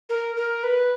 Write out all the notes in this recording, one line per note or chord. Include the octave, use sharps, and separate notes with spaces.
A#4
A#4
B4